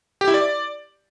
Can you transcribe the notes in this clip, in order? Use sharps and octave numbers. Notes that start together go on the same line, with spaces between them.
G4
E4
D5